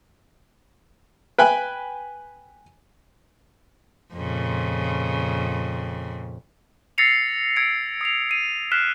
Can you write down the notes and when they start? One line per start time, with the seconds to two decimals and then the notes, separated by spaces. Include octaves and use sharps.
1.38 B4 G5 G#5 F#6
4.14 F2 A#2 C#3
6.98 E6 A6 A#6 C7 C#7 F7
7.56 E6 G#6 C#7 D7
8.01 D#6 C7 F7
8.29 C7 D#7
8.72 F6 F#6 B6 C7 E7